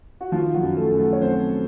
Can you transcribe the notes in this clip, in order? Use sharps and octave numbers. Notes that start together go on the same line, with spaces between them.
F#4
D#3 F3 F4
F#3 F#4
F#2
A3 A4
F#2
A3 A4
C#5
F#3 C4 C5